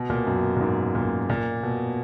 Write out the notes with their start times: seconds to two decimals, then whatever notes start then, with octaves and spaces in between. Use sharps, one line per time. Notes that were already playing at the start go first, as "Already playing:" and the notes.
Already playing: B2
0.10 A#2
0.27 F#2
0.57 A#2
0.61 G#2
0.95 A#2
1.30 A#2
1.63 B2